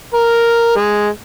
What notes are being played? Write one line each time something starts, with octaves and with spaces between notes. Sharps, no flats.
A#4
G#3